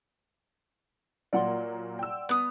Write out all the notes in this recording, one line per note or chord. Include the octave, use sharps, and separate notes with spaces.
A#2 F#3 A#3 D5 F#5 C6
G5 E6
B3 D#6 F#6